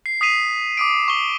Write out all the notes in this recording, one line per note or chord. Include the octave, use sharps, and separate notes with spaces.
C7
D#6 B6 C7 D#7 F7
D6 D#6 D7
C#6 G7